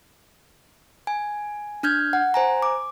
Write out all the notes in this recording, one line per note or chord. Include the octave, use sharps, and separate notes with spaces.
G#5
D4 F6 G6 G#6
F#5
C5 G#5 A#5
D6